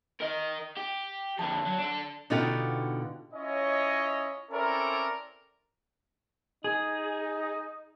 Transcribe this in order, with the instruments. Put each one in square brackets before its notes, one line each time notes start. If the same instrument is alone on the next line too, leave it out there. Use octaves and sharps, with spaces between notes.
[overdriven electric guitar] A#4 D#5
G4
[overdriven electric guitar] F2 D3 [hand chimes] A5
[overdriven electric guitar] F#3
D4 A4
[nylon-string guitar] B2 D3 B3 D#4 F4 G4
[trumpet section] C#4 E4 F4 C#5 D#5
C4 C#4 E4 A4 A#4 D5
[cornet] D#4 [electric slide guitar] G#4